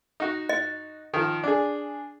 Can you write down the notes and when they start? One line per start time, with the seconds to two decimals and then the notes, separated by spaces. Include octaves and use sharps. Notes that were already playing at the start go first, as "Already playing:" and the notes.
0.20 D#4 F#4
0.49 D#5
1.14 D#3 F3
1.44 D4 G#4